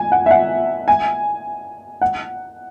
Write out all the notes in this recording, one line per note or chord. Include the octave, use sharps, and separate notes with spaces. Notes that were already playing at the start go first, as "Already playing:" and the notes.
Already playing: G#5
F#5
E5
F#5
G#5
F#5